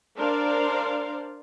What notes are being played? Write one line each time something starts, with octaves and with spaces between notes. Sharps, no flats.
D4 A#4 C5 D5 F5